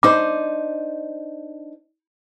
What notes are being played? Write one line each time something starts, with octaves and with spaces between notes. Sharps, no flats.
D4 D#4 C5 D6